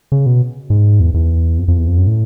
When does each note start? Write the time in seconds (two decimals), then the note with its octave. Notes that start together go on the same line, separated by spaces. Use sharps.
0.12 C#3
0.26 B2
0.70 G#2
1.00 E2
1.14 E2
1.58 F2
1.68 F2
1.78 E2
1.87 F2
1.98 F#2
2.07 A2